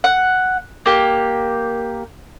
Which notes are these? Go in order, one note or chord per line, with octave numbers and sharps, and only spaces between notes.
F#5
A#3 G4